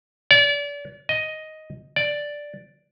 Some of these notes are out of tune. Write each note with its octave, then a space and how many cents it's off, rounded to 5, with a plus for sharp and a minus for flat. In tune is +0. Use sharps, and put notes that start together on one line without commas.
D5 -35
D#5 +5
D5 +0